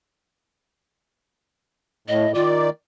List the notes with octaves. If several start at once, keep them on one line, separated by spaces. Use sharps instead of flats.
A2 D#5
D#3 F4 D5